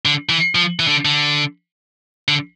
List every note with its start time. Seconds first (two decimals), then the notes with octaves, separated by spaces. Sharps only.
0.05 D3
0.29 E3
0.55 F3
0.80 E3
0.88 D3
1.05 D3
2.28 D3